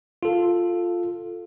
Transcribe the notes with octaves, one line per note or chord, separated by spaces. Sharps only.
F4 A4